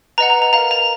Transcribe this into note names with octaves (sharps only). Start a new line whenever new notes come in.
B4 D#5 F#5 A#5
A#5
A#5
A#4 F5 A#5
A#5